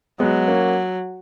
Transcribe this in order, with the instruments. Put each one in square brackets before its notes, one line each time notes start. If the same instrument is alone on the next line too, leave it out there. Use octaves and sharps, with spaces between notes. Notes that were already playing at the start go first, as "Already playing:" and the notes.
[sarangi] F#3 [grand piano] G#3 B3
[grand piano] A#3 C#4